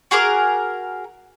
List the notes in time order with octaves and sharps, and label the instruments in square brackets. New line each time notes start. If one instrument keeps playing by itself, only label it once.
[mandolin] F#4 G#4 A#4 D6